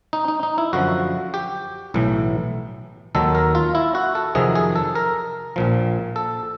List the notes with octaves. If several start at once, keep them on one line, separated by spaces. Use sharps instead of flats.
D#4
D#4
D#4
E4
F#2 D3 F3 F#4
G4
B1 A2 E3
D#2 D#3 F#3 A4
A#4
F4
E4
F#4
A4
F2 C3 D#3 F#3 G#4
G#4
A4
A#4
A#1 A#2 F3
A4